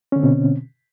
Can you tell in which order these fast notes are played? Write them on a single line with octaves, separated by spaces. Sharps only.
C#4 D3 C4 B2